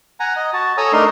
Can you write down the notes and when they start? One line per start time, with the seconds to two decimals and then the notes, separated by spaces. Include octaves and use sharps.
0.20 F#5 G#5 A#5
0.36 D#5
0.53 F#4 A5
0.77 A4 C#5 G#5 A#5 D#6 E6
0.93 A3 D4 D#4 A#4 C6